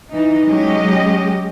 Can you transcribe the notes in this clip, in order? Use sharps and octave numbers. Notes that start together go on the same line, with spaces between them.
E3 D#4
F#3 G#3 C#4 G4 D#5